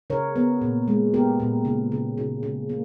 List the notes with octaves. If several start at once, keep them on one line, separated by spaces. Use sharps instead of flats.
C#3 A#4 C#5
B3
A#2
G#3
B3 G4 A#4
A#2
C#3
C#3
C#3
C#3
A#3